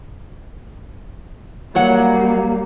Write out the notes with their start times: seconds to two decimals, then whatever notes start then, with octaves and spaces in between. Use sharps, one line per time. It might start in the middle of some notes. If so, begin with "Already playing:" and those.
1.75 F#3 G3 A#3 C#5 F#5